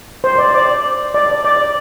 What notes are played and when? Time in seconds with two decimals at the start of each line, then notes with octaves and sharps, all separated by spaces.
0.24 C5
0.38 D5
0.54 D5
1.14 D5
1.45 D5